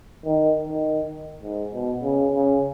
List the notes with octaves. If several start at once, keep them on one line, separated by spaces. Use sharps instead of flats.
D#3
D#3
G#2
B2
C#3
C#3